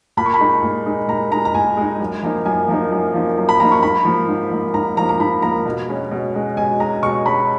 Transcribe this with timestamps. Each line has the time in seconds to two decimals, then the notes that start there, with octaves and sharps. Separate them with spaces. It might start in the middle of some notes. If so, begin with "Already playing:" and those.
0.17 A#2 B5
0.26 C#6
0.34 B5
0.40 G#3 D#4
0.63 A#2
0.86 G#3 D#4
1.08 A#2 A#5
1.32 G#3 D#4 A#5
1.45 A#5
1.54 A#2 G#5
1.77 G#3 D#4
2.00 F#2
2.23 F3 A#3 D#4
2.45 F#2 G#5
2.68 F3 A#3 D#4
2.92 F#2
3.14 F3 A#3 D#4
3.37 F#2
3.49 B5
3.60 F3 A#3 D#4 A#5
3.72 C#6
3.83 G#2 B5
4.05 F3 A#3
4.28 G#2
4.51 F3 A#3
4.74 G#2 A#5
4.97 F3 A#5
5.01 A#3
5.09 A#5
5.20 G#2 B5
5.42 F3 A#3 A#5
5.65 B2
5.89 G#3 C#4
6.11 B2
6.34 G#3 C#4
6.57 B2 G#5
6.80 G#3 C#4 A#5
7.03 B2 C#6
7.25 G#3 C#4 B5